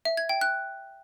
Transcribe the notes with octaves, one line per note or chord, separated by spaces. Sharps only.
E5
G#6
G5
F#6